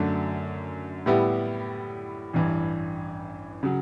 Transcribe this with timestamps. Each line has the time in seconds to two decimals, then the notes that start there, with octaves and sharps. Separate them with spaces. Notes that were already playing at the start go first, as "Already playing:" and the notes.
Already playing: F#2 D3 A3 D4 F#4
1.06 A2 G3 B3 E4 G4
2.33 A1 G2 E3
3.63 C#3 F#3